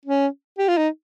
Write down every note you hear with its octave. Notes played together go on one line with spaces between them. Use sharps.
C#4
G4
F4
D#4